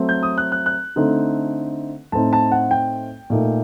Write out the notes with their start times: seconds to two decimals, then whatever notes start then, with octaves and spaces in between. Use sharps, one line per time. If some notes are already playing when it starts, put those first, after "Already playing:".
Already playing: F#3 A3 C4
0.09 G6
0.23 D#6
0.38 F#6
0.52 F#6
0.66 F#6
0.96 D3 A3 C4 D#4
2.12 A2 A3 C4 D#4 A5
2.33 A5
2.52 F#5
2.71 G5
3.30 A#2 A3 D#4